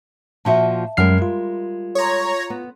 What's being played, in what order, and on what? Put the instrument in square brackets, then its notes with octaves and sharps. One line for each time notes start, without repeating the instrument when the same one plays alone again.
[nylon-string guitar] A#2 F3 F#4 [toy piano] E5 F5 A5
[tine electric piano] F#2 F6 C7 [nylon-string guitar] G3 G#3 A#4
[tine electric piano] F4
[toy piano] A4 C6 [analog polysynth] C#5 A#5
[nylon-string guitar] B3